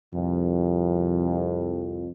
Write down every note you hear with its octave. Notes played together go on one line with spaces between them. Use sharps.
C2 F2